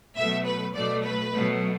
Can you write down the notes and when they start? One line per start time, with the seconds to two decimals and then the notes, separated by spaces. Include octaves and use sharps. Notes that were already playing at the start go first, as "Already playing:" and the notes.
0.16 B2 F#3 A3 E5
0.46 B4
0.74 B2 F#3 A3 D5
1.04 B4
1.32 B2 F#3 A3